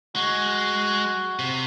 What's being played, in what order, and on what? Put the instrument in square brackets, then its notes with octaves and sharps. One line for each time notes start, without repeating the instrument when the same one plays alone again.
[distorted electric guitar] G#3 [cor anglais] F#4
[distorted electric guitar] C3